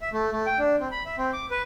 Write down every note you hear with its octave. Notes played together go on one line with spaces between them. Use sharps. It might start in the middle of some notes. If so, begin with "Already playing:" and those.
E5
A3
A3
G5
D4
C4
B5
E5
C4
D6
B4